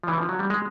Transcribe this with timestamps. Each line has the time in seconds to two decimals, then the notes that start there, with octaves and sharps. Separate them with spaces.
0.03 F3
0.08 E3
0.18 F3
0.29 F#3
0.39 G3
0.50 G#3